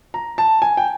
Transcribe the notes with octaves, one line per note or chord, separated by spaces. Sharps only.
A#5
A5
G#5
G5